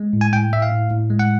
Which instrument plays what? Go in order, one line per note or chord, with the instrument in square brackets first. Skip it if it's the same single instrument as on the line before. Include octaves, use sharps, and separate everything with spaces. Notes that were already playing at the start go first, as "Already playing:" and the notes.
Already playing: [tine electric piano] G#3
A2
G#5
A2 G5
A2 E5
F5
A2
A2
G#3
F#5